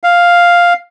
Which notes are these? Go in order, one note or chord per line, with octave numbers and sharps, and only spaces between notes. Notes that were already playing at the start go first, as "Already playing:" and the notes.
F5